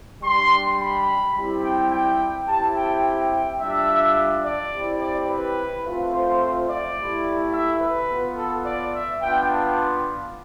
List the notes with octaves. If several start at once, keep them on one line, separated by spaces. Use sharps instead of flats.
G3 D4 G4 C6
B5
G3 C4 E4 G4
G5
G5
C4 E4 G4 A5
G5
G5
G5
G3 D4 F4 E5
D5
C4 E4 G4
D5
B4
A3 C4 F4
C5
D5
A3 E4 G4
E5
B4
B3 F4
A4
D5
E5
B3 D4 F4 G5
A5